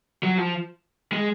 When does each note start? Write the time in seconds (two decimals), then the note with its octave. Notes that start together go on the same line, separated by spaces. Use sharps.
0.23 F#3
0.38 F3
1.12 G#3